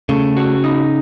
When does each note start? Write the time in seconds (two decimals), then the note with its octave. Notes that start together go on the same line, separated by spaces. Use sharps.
0.09 C#3 A3
0.37 F#4
0.64 D#4